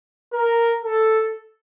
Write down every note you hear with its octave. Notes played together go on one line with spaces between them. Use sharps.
A#4
A4